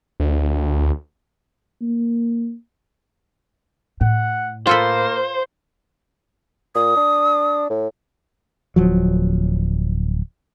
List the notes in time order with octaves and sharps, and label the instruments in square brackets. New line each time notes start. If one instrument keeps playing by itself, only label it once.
[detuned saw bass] D2
[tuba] A#3
[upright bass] A2 [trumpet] F#5
[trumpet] A#3 [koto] F4 A4 B4 [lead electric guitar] C5
[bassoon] A#2 [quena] D#6
[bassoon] D4
A2
[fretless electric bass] D1 F3 F#3